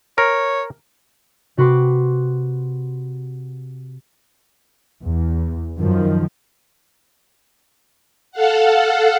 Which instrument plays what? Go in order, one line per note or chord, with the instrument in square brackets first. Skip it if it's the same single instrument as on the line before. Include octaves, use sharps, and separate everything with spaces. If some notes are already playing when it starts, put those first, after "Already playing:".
[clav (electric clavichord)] A#4 [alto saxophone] C#5
[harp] C3 F#4 B4 C6 D6
[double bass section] E2
F#2 D#3 F3
[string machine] A4 F5 F#5